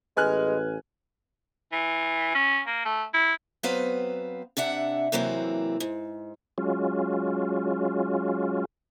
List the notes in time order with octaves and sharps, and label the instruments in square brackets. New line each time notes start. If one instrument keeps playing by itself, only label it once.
[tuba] A1 [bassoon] G#3 [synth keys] B4 [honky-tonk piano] G#5 F6 F#6
[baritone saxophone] E3
C#4
A#3
A3
E4
[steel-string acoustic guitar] F#3 B3 C4 B4 C5 F5
C3 D4 E5 F#5
C3 E3 F#3 A#3 C4
G#2
[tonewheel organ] F#3 G#3 C#4 F4